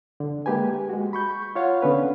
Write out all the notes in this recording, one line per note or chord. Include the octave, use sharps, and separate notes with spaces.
D3
G#3 A#3 G4 B4 G#5
G#3 F#4
B5 C#6 G6
F4 C#5 F5 F#5
D3 B3 C#4 B4